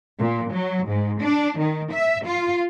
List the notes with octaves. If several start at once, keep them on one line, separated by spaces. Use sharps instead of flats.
A#2
F#3
G#2
D4
D#3
E5
F4